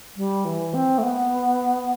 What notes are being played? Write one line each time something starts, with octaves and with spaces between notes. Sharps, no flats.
G3
E3
C4
A3
B3